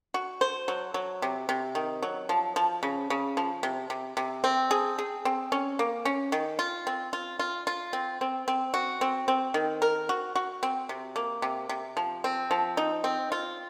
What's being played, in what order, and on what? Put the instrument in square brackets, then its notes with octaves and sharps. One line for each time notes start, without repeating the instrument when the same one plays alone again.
[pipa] F#4
C5
F#3
F#3
C3
C3
D#3
F#3
F3
F3
C#3
C#3
F3
C3
C3
C3
C4
G#4
G#4
C4
C#4
A#3
C#4
D#3
F4
C4
F4
F4
F4
C4
C4
C4
F#4
C4
C4
D#3
A#4
F#4
F#4
C4
C3
A#3
C3
C3
F3
C4
F3
D#4
C4
F4